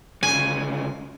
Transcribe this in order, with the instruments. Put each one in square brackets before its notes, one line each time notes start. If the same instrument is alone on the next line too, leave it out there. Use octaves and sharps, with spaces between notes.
[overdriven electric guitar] D2 C#3 [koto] G#5